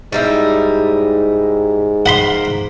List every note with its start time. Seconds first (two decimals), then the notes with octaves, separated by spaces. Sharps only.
0.12 G#2 G3 D#4 E4
2.06 A#3 F#5 B5 C6